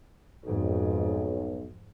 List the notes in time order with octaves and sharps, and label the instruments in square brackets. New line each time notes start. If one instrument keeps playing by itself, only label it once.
[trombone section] B1 [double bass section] F2 G#2